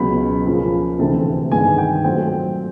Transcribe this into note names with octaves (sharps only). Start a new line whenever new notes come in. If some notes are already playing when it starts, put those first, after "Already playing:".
Already playing: C#2 B2 F#3 B5
C#2 C#3 F3 A#3
D2 C3 E3 A3 C4 A5
G2 D#3 G#3 B3 G#5
G5
A#2 F#3 A3 C4 G5